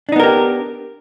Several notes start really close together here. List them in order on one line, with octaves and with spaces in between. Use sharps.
D4 D#4 B3 A#4 G4